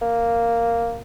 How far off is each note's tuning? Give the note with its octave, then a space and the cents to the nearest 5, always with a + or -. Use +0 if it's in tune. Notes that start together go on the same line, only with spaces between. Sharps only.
A#3 -5